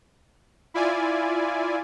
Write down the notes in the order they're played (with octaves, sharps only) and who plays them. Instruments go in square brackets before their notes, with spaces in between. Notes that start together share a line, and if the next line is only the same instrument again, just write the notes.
[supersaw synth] E4 F4 D5 G#5